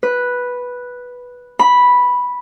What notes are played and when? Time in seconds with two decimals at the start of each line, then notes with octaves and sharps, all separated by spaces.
0.03 B4
1.59 B5